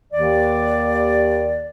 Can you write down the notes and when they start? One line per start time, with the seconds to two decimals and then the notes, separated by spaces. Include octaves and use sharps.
0.13 D#2 D#3 D5